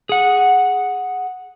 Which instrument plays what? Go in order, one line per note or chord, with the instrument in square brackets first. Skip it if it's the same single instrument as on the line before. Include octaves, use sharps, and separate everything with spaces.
[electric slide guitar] G#4 F#5